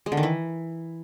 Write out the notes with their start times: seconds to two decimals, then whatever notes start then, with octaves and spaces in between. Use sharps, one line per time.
0.06 G#3
0.12 D3
0.17 D#3
0.23 E3